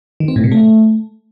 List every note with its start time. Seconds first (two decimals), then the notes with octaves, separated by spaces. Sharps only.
0.20 D#3
0.28 C4
0.36 A2
0.44 C3
0.52 A3